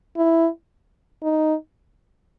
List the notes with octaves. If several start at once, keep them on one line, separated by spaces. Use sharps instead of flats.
E4
D#4